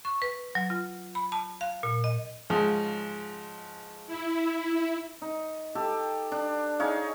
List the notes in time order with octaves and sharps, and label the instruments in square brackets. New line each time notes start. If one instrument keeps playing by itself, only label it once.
[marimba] C#6
B4
F#3
F4
B5
A5
F5
A#2
D#5
[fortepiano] G#2 C#3 F3
[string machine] E4
[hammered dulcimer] D#4
G4 A4
D4
D#4 G#4 C#5 F5